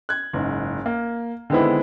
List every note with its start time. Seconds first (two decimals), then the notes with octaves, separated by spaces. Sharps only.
0.09 F#6 G#6
0.33 F#1 G#2
0.86 A#3
1.50 D3 D#3 G#3 B3 C4 E4